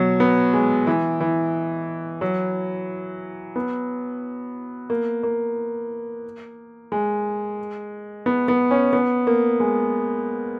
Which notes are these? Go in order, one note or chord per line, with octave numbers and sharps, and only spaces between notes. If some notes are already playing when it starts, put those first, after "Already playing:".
Already playing: B2 F#3
B3
G#3
E3
E3
F#3
B3
A#3
A#3
G#3
B3
B3
C#4
B3
A#3
G#3